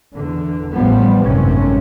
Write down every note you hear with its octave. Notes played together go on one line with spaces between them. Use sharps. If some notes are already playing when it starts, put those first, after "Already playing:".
E2 D3
A1 F3 G3 B3
G#1 F#2 A2 C3 C#4